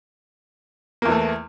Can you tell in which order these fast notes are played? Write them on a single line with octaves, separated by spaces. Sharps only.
A#3 E2 E3 A3